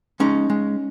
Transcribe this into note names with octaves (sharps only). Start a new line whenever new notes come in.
G#3 C#4 D#4
G#3